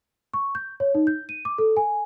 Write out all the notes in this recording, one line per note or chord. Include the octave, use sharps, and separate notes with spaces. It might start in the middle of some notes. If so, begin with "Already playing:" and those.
C#6
G6
C#5
D#4
G6
D#7
D6
A4
G#5